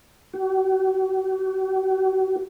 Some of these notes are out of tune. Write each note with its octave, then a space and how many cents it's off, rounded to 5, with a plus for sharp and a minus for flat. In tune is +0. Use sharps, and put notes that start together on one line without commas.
F#4 +45